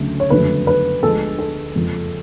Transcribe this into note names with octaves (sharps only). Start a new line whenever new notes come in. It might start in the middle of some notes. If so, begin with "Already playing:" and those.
Already playing: D2 C#3 F#3 A3
C#5
F#1 F2 D3 F#3 A3 B4
B4
D2 D3 F3 G#3 A4
A4
F#1 F2 F3 G#3